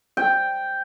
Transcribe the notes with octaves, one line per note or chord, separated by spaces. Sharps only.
G5